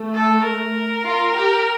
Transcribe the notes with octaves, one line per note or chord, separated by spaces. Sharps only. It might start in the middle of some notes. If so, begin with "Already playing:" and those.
Already playing: A3
A4
A#4
F4
G4